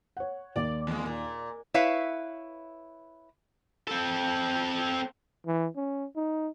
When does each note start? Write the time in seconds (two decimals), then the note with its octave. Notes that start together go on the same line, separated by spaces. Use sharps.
0.17 C#5 F#5
0.56 D#2 A#3 D5
0.87 E2 G#3
1.06 A#2
1.74 E4 B4 C#5 E5 F5
3.88 C4 A4
5.46 E3
5.76 C#4
6.16 D#4